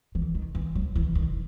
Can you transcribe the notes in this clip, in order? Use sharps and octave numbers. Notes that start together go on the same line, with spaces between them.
E3
D#3
E3
F#3
E3
D#3